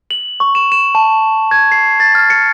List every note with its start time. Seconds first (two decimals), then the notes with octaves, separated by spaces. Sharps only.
0.11 F#7
0.40 C#6
0.55 E7
0.72 E7
0.95 A5
1.51 G#6
1.72 C7
2.00 A6
2.15 F6
2.30 C#7